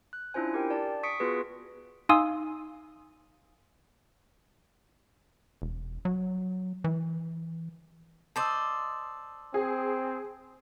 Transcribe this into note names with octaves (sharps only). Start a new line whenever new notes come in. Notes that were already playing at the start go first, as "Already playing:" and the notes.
F#6
C#4 D4 E4 F4 C5 G#5
G4 A#4 G5
D5 A5
C#6 D#6 B6 C#7 D7
B3 F4 F#4 G#4 B4
D#4 F5 G#5 C6 D#6 E6
E1
F#3
E3
C5 D5 D#5 A5 C6 E6
C4 G#4